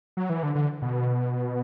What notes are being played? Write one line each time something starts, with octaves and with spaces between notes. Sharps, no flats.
F#3
E3
D3
D3
B2